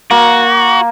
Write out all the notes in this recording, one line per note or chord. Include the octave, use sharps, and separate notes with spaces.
A#3 F#4